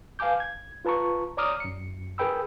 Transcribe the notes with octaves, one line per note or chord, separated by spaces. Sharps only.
B4 F5 G#5 A5 D6 G6
G#6
F4 B4 A5 A#5 C#6
C#5 D5 A#5 D6 D#6 F6
F#2 C#7
G#4 A#4 B4 G5 B5 E6